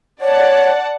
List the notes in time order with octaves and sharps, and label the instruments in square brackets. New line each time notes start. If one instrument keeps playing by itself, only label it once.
[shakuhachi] C#5 [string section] D5 F#5 A5